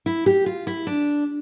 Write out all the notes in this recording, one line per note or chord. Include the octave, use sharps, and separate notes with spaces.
E4
G4
F4
E4
D4